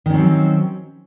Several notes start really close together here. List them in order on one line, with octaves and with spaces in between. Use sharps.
D#3 C#4 C4 F#3